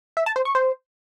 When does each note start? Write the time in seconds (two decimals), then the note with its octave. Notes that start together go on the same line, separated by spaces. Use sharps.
0.17 E5
0.26 A5
0.36 C5
0.45 C#6
0.55 C5